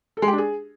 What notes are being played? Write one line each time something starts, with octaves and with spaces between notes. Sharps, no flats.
A4
G#3
G4
D4
G#4